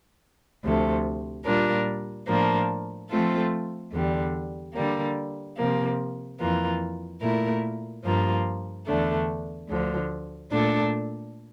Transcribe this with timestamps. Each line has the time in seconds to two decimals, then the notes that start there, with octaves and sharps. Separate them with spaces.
0.63 D2 C3 F3 A3
1.45 A#2 G3 D4 F4 A#4
2.27 A2 F3 A#3 D4
3.10 F3 A3 C4 F4 A4
3.92 E2 D3 G3
4.74 D3 G3 A#3
5.57 C3 F3 A#3
6.39 F2 E3 A#3 F4
7.21 A#2 A3 E4 A#4
8.04 G2 F3 A#3 F4
8.86 E2 D3 A3 D4
9.68 D2 D3 F3
10.51 A#2 A3 D4 A4